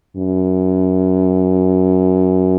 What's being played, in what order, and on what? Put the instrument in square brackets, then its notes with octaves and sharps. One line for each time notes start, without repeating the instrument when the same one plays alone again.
[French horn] F#2